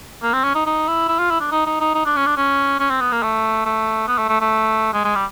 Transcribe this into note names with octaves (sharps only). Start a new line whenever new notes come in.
A#3
C4
C#4
D#4
D#4
E4
E4
F4
E4
D4
D#4
D#4
D#4
D#4
D4
C#4
D4
C#4
C#4
C4
B3
A#3
A3
A3
B3
A3
A3
A3
G#3
G#3
G3